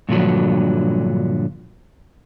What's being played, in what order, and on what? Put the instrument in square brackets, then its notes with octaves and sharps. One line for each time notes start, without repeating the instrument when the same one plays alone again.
[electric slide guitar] G2 A#2 D3 F3 F#3